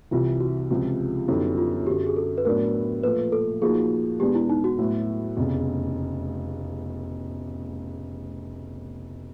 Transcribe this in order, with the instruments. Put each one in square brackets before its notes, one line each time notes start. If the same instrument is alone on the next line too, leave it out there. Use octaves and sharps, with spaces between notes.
[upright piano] C2 C3 E3 [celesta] F4
[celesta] F#4
[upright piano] C#2 C3 F3
[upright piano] F#2 D3 G3 B3 D#4 [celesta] E4
[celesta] F4
[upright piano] F#2 D3 F#3 [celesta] G4
[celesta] G#4
A4
B4
[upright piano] A2 F#3 B3 D4 [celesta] A#4
[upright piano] A#2 F3 A3 [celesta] B4
[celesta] A4
[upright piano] A#2 F3 A#3 D#4 F#4 [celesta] G#4
[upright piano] E2 B2 G#3 B3 D4 [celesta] G4
[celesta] E4
D#4
F#4
[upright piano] A2 F#3 B3 E4
F1 E2 C#3